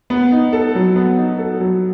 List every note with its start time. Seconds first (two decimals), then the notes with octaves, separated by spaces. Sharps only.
0.10 B3
0.32 D#4
0.53 A4
0.75 F#3
0.96 B3
1.17 D#4
1.39 A4
1.60 F#3